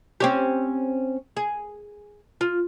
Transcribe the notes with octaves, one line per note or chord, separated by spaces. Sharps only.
C4 C#4 G4
G#4
F4